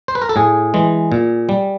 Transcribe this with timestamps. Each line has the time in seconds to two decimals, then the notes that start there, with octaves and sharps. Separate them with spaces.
0.08 C5
0.15 B4
0.22 A#4
0.29 A4
0.36 A2 G#4
0.74 E3 G#3
1.12 A#2
1.49 G3